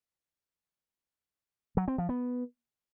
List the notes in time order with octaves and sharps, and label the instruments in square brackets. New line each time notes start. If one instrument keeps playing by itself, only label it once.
[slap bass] F#3
C4
F3
B3